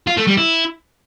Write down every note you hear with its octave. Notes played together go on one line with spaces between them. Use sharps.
F4
A3
G3
E4